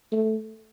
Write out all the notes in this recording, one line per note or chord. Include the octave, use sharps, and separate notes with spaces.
A3